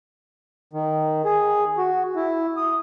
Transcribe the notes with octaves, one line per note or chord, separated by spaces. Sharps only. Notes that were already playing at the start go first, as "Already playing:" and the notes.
D#3
G#4
F#4
E4
D#6